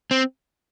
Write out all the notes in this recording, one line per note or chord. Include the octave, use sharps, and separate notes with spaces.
C4